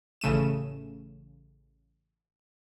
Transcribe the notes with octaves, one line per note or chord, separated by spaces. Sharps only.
A1 C#3 A3 D#7 E7